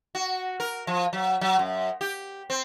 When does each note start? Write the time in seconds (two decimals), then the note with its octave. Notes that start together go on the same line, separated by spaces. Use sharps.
0.15 F#4
0.60 A#4
0.87 F3
1.13 F#3
1.41 F#3
1.59 F#2
2.01 G4
2.50 C4